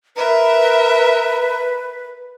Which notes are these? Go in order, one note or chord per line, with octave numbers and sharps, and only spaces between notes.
A#4 B4 E5